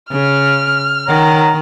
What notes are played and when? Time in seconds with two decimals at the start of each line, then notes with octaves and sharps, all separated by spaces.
0.11 C#3 F6
1.08 D#3 C#5 F#5 A#5